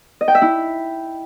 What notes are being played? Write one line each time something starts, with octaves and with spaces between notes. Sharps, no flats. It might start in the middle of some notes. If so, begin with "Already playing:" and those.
D#5
G5
E5
E4